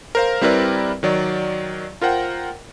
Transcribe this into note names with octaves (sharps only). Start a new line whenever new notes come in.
A#4 C5 F5
G3 C4 E4 A#4 B4 D5
D#3 F#3 D5
F4 A#4 C5 F#5 G5